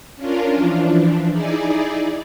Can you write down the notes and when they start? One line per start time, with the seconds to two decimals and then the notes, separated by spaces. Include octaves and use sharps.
0.16 C#4 D4 F4 A#4
0.55 E3 F3 D4
1.30 D#4 E4 G#4 D5